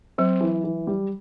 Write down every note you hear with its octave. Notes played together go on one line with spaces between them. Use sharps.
F#3 C4
E3
E3
G3